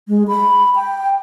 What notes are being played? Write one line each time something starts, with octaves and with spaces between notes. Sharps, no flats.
G#3
B5
G5